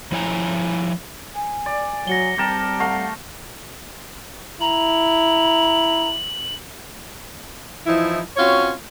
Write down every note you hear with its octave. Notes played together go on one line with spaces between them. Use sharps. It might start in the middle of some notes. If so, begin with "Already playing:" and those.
F3 E4 C#5 F5 G#5 A#5
G#5
D5
F#3 A#6 C#7 G7
G3 C4 G4 A#4 A5
A3 F5 F#5
E4 A#5 F#7
E3 F3 D#4 E4
C4 C#4 F4 F#4 C#5